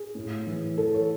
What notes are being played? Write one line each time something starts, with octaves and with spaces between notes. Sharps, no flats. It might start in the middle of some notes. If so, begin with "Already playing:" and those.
Already playing: G#4
A2
E3
E3 A4
C#5